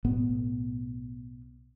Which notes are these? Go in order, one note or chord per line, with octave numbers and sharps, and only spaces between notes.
B1 A2 B3